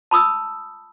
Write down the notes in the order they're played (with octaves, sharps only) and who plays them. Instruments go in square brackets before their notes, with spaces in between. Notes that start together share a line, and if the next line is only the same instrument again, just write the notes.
[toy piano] A5 B5 D#6 E6